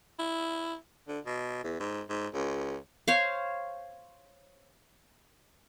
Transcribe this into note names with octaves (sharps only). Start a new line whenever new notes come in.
E4
D3
B2
E2
G#2
G#2
C#2
C5 C#5 F5